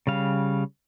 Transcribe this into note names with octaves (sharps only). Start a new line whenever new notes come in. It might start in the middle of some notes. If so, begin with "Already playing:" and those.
C#3 G3 F5